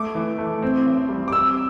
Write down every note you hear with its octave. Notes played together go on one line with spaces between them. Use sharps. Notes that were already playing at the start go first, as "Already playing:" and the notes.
Already playing: A3 D6
E3
A3
C4
A1
G3
D6
C4 E6